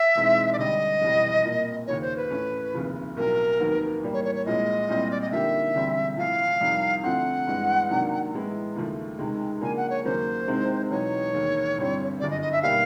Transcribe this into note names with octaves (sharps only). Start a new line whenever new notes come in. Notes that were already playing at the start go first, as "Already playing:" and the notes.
Already playing: E5
E2 B2 G#3 C4 D#4
D5
D2 D3 G3 D#5
F1 E2 B2 G3
A#2 F3 A#3
D#2 C#3 F3 C#5
C5
B4
A2 E3 A3 C#4
F1 D#2 C#3 F3
B1 A2 F#3 A#4
F1 D#2 D#3 F#3 B3
A2 E3 G3 A#3
C#5
C#5
C#5
C2 A#2 F3 G#3 D#5
C2 A#2 G3 C4
D5
D#5
D3 F3 A#3 D#4 G4 E5
E1 D2 D3 G3 C4
A1 A2 F3 F5
F2 C3 D#3 G3
D3 F3 A3 C4 F#5
G2 E3 G#3 B3
C3 D#3 F#3 A#3 D4
A2 E3 G#3 B3 E4
D#2 C#3 F3 A3
C#2 C3 D#3 G#3
C#3 F3 A#3 D4 G#5
F#5
C#5
D#2 C#3 F#3 A#3 C#4 C5
C2 C3 D#3 G#3 C4
E2 B2 F#3 B3 D#4 C#5
E1 D#2 D#3
A1 G2 D3 G3 C4
G1 F#2 D3 D5
D#5
D#5
E5
B2 G3 A#3 D#4 G4 F5